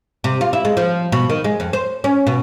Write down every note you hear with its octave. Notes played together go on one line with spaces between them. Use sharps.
C3
F4
E4
G#3
F3
B2
D#3
G#3
F2
C5
C#4
B2